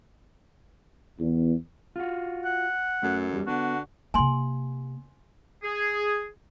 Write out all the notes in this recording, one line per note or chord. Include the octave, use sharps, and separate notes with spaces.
E2
F4 F#4
F#5
F#2 A3
E2 G3
D3 B3 F#4
C3 A#3 G#5 C6
G#4